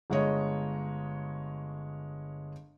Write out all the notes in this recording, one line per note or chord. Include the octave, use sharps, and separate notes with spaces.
G1 G#3 C#5 D#5